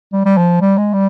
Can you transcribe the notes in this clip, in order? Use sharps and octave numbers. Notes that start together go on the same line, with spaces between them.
G3
G3
F3
G3
G#3
G3